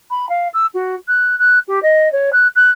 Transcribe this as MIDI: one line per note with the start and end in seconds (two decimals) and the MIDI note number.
0.10 0.29 83
0.29 0.48 77
0.54 0.66 88
0.74 0.95 66
1.08 1.38 90
1.39 1.59 90
1.68 1.82 67
1.82 2.11 75
2.12 2.30 73
2.33 2.48 90
2.55 2.71 90